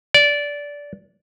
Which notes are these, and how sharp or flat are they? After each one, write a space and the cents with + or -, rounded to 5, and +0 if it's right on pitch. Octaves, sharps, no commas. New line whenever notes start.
D5 -15